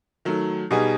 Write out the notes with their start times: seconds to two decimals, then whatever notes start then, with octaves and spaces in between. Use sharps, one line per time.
0.25 D#3 F#3 A3
0.71 B2 G3 B3 D#4 G#4